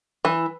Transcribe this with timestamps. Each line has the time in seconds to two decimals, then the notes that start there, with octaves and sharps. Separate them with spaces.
0.25 E3